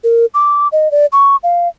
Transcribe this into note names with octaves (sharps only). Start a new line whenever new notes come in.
A#4
D6
D#5
D5
C#6
F5